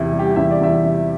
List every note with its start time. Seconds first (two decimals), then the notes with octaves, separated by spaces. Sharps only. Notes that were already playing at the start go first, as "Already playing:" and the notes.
Already playing: E2 C3 E4
0.13 G3
0.19 G4
0.36 E2 E5
0.51 D5
0.61 E2 E5
0.83 C3